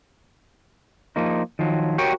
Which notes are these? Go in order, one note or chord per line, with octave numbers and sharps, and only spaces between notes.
F3 A#3 D#4
D#3 F3 F#3
F#4 G4 A#4 C#5 G5